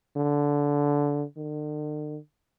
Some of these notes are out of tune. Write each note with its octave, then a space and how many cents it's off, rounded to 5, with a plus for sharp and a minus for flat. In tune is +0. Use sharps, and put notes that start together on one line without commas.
D3 -15
D3 +45